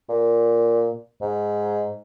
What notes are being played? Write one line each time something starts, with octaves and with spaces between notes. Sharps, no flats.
A#2
G#2